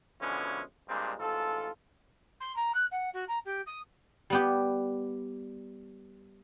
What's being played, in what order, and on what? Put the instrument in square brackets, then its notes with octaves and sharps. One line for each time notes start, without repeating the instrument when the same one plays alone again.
[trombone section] B2 D3 E3 F3 G#3 C#4
G2 A#2 G3 G#3 C4 D4
A1 G#2 F4 A4
[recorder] C6
A#5
F#6
F#5
F#4
A#5
G4
D#6
[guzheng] G3 B3 G4